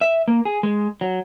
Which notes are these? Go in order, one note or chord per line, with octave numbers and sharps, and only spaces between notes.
E5
A#3
G#4
G#3
F#3